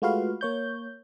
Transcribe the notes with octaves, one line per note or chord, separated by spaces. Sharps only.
G#3 A3 F4 F#4 B4 F5
A#3 C#5 G6